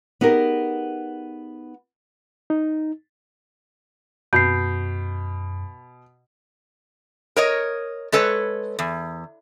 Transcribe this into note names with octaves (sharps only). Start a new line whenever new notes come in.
B3 D#4 G4 G#4 A#4
D#4
F#2 B2 G6 C7
A#4 C#5 D#5
G#3 A4 B4 C#5
E2